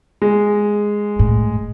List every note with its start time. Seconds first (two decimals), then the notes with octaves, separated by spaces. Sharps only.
0.22 G#3
1.19 A2